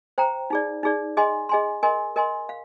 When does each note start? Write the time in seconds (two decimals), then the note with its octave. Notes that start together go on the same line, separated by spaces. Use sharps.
0.18 C5 G5 A#5
0.50 D#4 G#4 D5
0.83 D#4 G#4 D5
1.17 G#4 D#5 G#5 C6
1.49 G#4 D#5 G#5 C6
1.83 A#4 D#5 G#5 C6
2.16 A#4 D#5 G#5 C6
2.49 F5